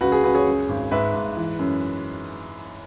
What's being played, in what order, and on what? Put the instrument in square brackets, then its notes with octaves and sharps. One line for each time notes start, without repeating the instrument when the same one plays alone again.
[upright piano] C#2 F#4 B4
G#4
C#2 F#4 B4
G#4 C#5
F#2
G#1
G#2 B4 E5
G#2
E3
F#2